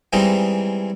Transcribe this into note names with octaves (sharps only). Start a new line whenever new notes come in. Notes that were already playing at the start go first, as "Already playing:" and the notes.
E3 G3 G#3 C4 D#4